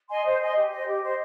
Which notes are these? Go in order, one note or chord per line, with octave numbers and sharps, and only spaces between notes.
D#5 G#5 C6
C5
D#5 G#5 C6
G4
D#5
C5
G4
C5 D#5